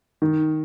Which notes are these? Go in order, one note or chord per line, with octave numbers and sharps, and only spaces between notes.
D#3